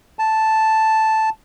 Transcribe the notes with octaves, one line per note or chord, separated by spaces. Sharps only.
A5